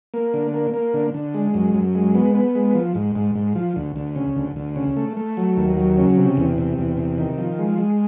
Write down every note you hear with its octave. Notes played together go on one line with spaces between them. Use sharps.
A#3
D3
A#3
A#3
D3
D3
G#3
F#2
F#2
G#3
B3
B3
G#3
F3
G#2
G#2
G#2
F3
D2
D2
C#3
D2
D2
C#3
A3
A3
F#3
D#2
F#3
C#3
C3
E2
C3
E2
C3
D#3
F3
G#3
G#3